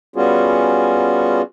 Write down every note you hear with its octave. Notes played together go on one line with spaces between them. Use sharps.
G3 B3 C#4 F4 F#4 G#4